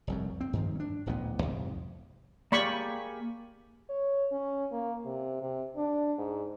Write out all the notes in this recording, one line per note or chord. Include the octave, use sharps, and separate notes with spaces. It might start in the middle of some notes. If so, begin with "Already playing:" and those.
F1 C2 F#2
C4
G2 D#3 F3
C#4 D4
D1 A1 A#2 B3
C2 F2 G#2
A#3 G4 G#4 D5 B5 C#6
C#5
C#4
A#3
C3
C3
D4
G#2